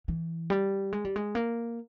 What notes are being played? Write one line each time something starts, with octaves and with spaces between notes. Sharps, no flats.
E3
G3
G#3
G3
G#3
A#3